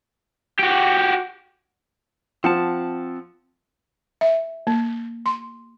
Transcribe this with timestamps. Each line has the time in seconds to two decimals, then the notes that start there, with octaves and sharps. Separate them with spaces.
0.60 F#4 G4
2.44 F3 C4 F#5 A5
4.21 E5
4.67 A#3
5.26 C6